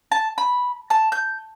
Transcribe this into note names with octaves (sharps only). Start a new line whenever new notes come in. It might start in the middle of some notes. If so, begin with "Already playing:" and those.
A5
B5
A5
G6